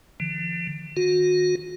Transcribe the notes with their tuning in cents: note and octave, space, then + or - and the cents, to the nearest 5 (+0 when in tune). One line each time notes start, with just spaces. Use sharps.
D3 +25 F3 -45
D#3 +0 F#4 -35